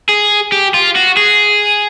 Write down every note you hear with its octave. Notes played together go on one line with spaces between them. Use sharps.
G#4
G4
F4
F#4
G#4